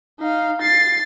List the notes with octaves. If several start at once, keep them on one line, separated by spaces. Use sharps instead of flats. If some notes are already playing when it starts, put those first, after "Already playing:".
D#4 F5
A6 C7